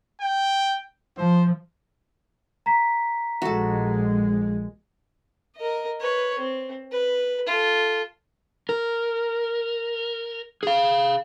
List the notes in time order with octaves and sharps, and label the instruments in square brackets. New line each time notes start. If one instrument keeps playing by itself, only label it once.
[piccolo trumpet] G5
[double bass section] F3 [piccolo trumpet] C5
[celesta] A#5 B6
[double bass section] A#1 G#3 [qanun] F#4 A4
[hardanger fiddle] A#4 D#5
B4 C#5
C4
B4
F4 A4
[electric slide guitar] A#4
G#4 F5